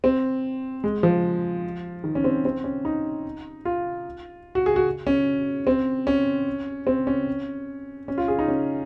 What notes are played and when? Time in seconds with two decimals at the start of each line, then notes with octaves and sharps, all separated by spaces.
0.04 C4
0.84 G#3
1.03 F3
2.04 D#3
2.15 C#4
2.24 C4
2.45 C4
2.64 C#4
2.85 D#4
3.65 F4
4.55 F#4
4.66 G#4
4.76 F#4
5.07 C#4
5.67 C4
6.07 C#4
6.87 C4
7.07 C#4
8.08 C#4
8.18 F4
8.28 G#4
8.39 D#4
8.48 C#4